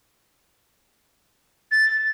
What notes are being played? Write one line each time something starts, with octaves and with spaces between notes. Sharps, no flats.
A6